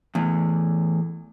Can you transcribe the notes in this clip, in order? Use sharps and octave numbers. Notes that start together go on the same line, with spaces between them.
E2 A2